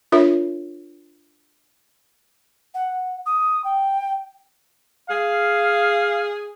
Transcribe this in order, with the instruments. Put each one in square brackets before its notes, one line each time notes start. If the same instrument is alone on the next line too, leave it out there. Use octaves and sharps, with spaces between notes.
[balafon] D4 F4 A#4 C#5 E5
[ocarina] F#5
D#6
G5
[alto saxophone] G#4 [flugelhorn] F5